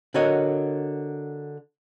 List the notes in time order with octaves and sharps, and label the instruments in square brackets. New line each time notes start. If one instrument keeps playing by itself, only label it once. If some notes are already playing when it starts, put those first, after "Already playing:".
[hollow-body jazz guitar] D3 F#4 A#4 C#5 D#5